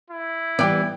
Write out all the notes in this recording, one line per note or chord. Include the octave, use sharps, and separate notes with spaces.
E4
E3 G3 B3 D5 G5